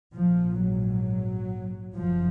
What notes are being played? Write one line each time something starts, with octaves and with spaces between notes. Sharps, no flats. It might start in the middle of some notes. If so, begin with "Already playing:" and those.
A#1 G#2 F3
F#3
F#1 F#2 F3